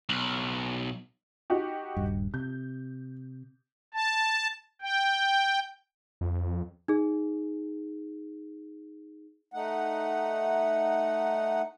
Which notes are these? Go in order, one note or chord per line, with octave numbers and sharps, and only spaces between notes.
B1
D#4 F#4 G4
D#1 G2
C3 G6
A5
G5
F2
D#4 G#4
A3 D#4 F#5